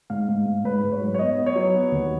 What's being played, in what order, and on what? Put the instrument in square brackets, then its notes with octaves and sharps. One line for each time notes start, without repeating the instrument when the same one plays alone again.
[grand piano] G#2 F5
G#2
G#2
G#2 B4
G#2
C#5
F#3
C#5
B3 D#5
B3
C#5
F#3
B3
D#2